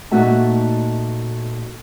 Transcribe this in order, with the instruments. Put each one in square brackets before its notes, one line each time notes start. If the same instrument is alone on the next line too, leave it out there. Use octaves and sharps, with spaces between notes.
[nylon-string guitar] A#2 A3 D#4 F#4 E5 A5